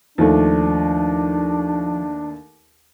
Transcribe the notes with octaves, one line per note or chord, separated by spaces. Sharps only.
D#2 F3 A3 D4